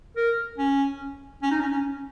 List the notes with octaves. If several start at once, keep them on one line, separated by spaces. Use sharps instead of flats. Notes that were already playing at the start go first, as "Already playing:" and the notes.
A#4
C#4
C#4
D#4
C#4
C#4